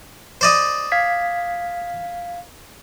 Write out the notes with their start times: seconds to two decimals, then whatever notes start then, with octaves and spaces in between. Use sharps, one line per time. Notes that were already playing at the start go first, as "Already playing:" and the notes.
0.41 C5 D5 D#5
0.92 F5 G#6 B6